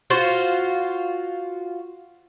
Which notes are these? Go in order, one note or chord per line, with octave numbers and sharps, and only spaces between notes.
F4 F#4 C5